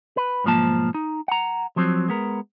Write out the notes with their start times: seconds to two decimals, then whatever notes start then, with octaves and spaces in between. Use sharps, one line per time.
0.17 B4
0.44 B1 G#2 F3 A#3 A5
0.94 D#4
1.28 F#5 A#5
1.76 F3 F#3 C4
2.09 G#3 B3 A#4